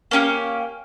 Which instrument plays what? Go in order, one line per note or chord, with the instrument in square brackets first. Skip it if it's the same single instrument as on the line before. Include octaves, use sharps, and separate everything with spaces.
[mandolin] A#3 C#4 G4